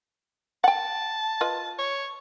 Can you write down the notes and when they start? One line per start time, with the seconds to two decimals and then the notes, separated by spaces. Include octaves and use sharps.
0.64 F#5 G5 A5
1.41 F4 B4 D#5
1.79 C#5